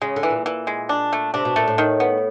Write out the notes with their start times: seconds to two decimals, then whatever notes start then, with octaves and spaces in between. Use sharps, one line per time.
0.02 C#3 G#3
0.16 D3
0.23 E3
0.30 A#2
0.46 E3
0.67 G#3
0.89 D4
1.13 A3
1.34 C3 D4
1.45 B2
1.56 A#2 A3
1.68 A2
1.78 D#3
2.00 B3